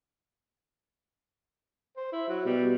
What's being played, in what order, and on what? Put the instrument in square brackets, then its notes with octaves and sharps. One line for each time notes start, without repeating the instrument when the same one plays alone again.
[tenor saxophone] C5
E4
F#3
[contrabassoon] B2 [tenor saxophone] G3